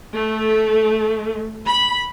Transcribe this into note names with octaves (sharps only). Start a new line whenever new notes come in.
A3
B5